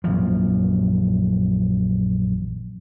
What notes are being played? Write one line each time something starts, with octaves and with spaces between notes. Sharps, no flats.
A#1 F#2 E3 F3